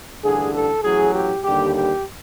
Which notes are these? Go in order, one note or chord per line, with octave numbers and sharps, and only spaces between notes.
A1 G2 D3 G#4
A4
A1 A2 F#3 G#4
G4
D#2 D3 G3 G4
G4